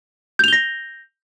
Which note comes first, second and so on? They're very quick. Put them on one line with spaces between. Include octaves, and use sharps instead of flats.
G6 F7 G7 A#6